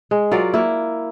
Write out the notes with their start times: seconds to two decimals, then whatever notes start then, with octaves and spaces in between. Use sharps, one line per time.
0.11 G#3
0.32 F#3 F4 A#4 D5
0.54 A#3 E4